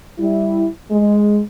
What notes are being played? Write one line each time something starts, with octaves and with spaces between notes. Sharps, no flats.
G3 E4
G#3